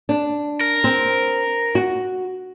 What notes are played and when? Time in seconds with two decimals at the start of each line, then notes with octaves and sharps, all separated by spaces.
0.09 D4
0.61 A#4
0.84 C4
1.75 F#4